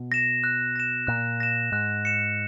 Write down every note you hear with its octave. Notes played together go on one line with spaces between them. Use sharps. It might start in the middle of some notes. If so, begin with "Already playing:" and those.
Already playing: B2
A#6 E7
F#6
A#6 E7
A#2 F#6
A#6 E7
G#2 F#6
C#7 E7